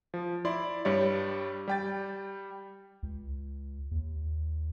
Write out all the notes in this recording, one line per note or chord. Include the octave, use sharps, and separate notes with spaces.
F3
E4 D5 C6
G2 G3 C#5 D5
G3 G5 A6
C#2
D#2